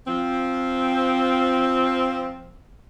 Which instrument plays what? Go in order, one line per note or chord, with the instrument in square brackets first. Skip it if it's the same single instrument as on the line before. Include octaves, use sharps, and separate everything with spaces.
[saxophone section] F3 C4